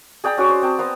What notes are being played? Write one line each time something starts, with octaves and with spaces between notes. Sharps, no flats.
G#4 D5 G5 A#5
C#4 F#4 C#5 D5
C5
C4 G5 A5
B3 C5 A#5